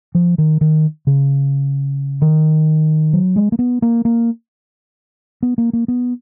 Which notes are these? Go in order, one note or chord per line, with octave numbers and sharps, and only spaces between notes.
F3
D#3
D#3
C#3
D#3
F#3
G#3
A#3
B3
A#3
A#3
B3
A#3
A#3
B3